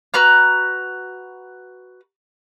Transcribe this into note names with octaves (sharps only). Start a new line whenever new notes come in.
F#4 B4 A#5 F6